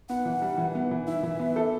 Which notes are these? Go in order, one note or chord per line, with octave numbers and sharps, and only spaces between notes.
B3 F#5
E3
G3
E3
B3
E3
E4 E5
E3
B3
A4